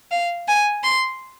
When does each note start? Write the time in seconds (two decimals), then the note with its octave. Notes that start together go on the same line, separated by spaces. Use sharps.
0.11 F5
0.48 G#5
0.84 C6